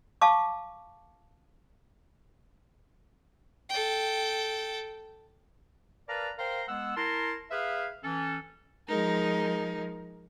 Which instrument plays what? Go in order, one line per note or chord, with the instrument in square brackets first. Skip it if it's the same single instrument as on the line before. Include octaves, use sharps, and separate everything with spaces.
[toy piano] F5 A5 C#6 D6
[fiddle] A4 G5
[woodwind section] A#4 B4 D5 F5 A5 A#5
A#4 C5 F5 G5 A#5 C6
G#3 B3 F#5 E6
E4 A#4 A5 A#5 C6
G#4 B4 E5 F5
E3 C#4 A4
[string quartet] F3 G#3 D#4 A#4